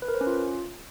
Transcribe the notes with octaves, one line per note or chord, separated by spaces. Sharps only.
B4
A#4
C5
C#4
F4